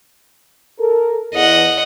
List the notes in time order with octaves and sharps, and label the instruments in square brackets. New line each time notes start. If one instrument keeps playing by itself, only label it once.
[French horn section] A4 A#4
[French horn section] E2 [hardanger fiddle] D#5 F#5